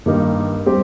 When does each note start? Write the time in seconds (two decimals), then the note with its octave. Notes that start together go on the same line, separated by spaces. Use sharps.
0.06 G2 D#3 G3 A#3 D#4
0.66 G3 C4 G4